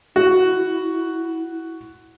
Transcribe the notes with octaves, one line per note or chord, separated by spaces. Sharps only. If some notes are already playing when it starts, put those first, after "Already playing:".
E4 F#4